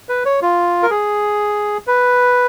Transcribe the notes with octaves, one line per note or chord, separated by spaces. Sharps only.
B4
C#5
F4
A#4
G#4
B4